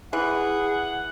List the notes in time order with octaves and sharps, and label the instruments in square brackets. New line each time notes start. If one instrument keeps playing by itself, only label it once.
[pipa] E3 [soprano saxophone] G#4 [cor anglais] F#5